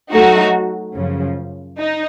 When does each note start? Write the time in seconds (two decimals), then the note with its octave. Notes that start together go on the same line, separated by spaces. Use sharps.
0.12 F#3 A3 D#4 F#4
0.95 F#2 C#3 F3
1.78 D#4